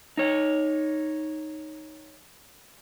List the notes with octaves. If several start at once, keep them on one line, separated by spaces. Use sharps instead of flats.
D#4 C#5